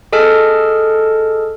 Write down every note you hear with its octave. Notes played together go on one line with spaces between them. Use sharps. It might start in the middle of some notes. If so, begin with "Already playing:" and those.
G#4 A4 D#5 A5 F6